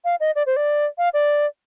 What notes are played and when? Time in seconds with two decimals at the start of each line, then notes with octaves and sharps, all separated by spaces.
0.05 F5
0.20 D#5
0.35 D5
0.46 C5
0.56 D5
0.98 F5
1.14 D5